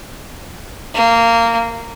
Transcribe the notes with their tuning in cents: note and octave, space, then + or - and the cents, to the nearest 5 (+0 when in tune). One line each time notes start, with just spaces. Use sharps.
A#3 -15